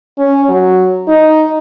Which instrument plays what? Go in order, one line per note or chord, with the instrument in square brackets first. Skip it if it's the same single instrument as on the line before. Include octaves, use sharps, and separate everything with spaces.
[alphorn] C#4
F#3
D#4